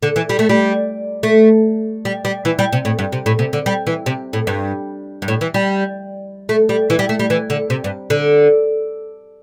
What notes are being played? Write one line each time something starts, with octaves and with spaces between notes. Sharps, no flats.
D3
E3
G3
A3
G3
A3
G3
G3
E3
G3
C3
A2
G2
C3
A2
C3
D3
G3
E3
C3
A2
G2
G2
A2
E3
G3
A3
G3
E3
G3
A3
G3
E3
D3
C3
G2
D3